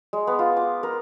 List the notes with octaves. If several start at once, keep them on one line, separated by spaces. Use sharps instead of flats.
G#3
B3
F4
D6
A#4